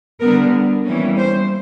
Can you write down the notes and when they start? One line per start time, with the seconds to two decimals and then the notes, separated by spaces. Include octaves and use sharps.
0.20 D3 G3 B3 A#4
0.85 E3 G3 A#3 C#4
1.18 C5